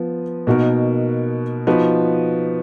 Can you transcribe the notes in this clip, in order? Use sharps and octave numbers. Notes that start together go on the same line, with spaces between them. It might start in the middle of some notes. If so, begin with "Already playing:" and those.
Already playing: F3 B3
B2 A#3 D#4 F#4 A#4
F3 B3 D#4 F#4 B4